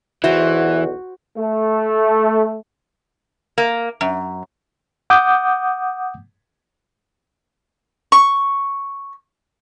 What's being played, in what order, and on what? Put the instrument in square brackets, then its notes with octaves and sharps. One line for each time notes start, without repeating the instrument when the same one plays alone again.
[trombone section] B1 E2 [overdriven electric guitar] E3 [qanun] F#4 C5 [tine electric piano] E5
[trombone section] A3
[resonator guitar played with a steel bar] A#3
F#2
[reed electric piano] F#5 D6 D#6 G6
[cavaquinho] C#6